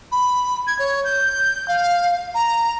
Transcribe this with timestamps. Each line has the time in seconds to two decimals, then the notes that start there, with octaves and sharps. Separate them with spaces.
0.12 B5
0.67 G#6
0.79 C#5
1.04 G6
1.68 F5
2.35 A#5